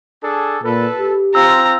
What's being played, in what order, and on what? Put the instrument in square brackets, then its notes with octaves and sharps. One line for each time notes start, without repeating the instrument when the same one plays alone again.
[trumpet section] D4 G#4 A4
[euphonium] A#2 [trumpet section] A4 B4
[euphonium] G4
[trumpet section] C4 F4 [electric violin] A#5 [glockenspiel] E6